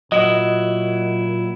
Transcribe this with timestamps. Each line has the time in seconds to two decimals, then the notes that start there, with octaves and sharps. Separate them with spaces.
0.12 A#2 F#3 E4 D#5